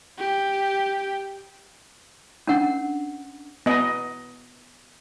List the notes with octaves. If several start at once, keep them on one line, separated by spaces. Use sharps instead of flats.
G4
C#4 D4 A#4 F#5
B3 D#5